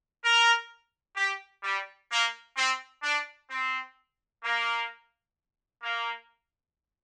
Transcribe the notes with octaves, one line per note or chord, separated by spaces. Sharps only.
A#4
G4
G3
A#3
C4
D4
C4
A#3
A#3